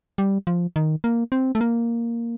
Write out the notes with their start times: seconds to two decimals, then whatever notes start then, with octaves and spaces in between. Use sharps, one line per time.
0.18 G3
0.47 F3
0.76 D#3
1.04 A#3
1.32 C4
1.55 A3
1.61 A#3